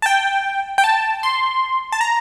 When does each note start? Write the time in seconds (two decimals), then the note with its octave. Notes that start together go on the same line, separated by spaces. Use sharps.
0.02 A5
0.06 G5
0.78 G5
0.84 A5
1.23 C6
1.92 A5
2.01 A#5